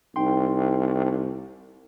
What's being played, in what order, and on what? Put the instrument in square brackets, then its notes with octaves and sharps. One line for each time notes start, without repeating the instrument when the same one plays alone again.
[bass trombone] C2 [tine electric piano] D#4 G5 C6